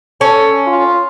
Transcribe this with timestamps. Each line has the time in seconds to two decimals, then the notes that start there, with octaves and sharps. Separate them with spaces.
0.21 C#4 A4
0.67 F4